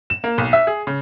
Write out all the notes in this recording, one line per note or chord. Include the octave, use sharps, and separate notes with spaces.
E7
A#3
B1
E5
G#4
C#3